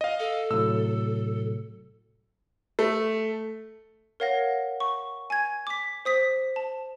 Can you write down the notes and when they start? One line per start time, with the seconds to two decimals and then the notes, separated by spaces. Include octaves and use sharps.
0.01 D#5 F5
0.20 A4
0.51 A2 C3 F#3 E6
2.79 A3
4.20 A#4 C#5 F5 F#5 A#6
4.80 C#6
5.30 G#5 G#6
5.67 D6 B6
6.05 C5 D#6 B6
6.56 A5